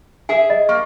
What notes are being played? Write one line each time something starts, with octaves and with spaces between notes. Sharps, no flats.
G#4 E5 G#5
D#5
A#3 C#6